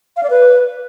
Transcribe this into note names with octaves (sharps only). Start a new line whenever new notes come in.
F5
D5
B4